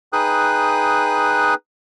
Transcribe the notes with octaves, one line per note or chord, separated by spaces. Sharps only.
D#4 G#4 B4 G5 D#6 F#6